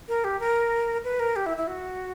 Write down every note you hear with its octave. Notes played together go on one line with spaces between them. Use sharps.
A#4
G4
A#4
B4
A#4
G4
E4
E4
F#4